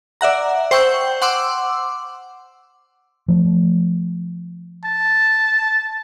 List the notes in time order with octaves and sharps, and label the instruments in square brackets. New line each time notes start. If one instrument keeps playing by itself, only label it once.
[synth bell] D5 E5 F#5 A#5
C5 G5 C#6 E6 G6
F#5 C6 D6 E6
[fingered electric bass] F3 A3
[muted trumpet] A5